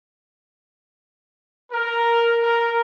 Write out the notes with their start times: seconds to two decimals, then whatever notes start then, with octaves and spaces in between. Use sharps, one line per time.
1.72 A#4
2.41 A#4